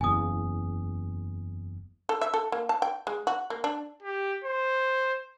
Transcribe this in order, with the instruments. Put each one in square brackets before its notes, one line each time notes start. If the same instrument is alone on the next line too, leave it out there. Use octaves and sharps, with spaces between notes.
[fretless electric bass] F#1 E2 [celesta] G#5 D#6
[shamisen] A4
E5
A4
A#3
A5
G5
G#3
F#4
A#3
D4
[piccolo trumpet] G4
C5